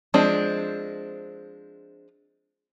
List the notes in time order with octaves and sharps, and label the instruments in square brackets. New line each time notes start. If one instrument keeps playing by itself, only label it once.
[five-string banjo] F3 G#3 C4 D4